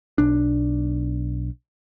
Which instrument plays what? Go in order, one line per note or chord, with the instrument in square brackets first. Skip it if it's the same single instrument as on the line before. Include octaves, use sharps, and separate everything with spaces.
[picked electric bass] B1 D4